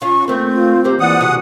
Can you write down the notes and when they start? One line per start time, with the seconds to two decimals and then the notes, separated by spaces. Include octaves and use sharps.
0.02 C#4 F4 C#6
0.28 A3 A#3 C4
0.55 F4
0.84 D#2 A#3 G4 C5
1.00 E3 D5 F#5 D#6
1.21 C3 F#4 G#4